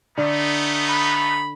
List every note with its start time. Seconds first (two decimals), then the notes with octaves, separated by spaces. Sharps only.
0.18 D3 A3 B3 D#4
0.88 B5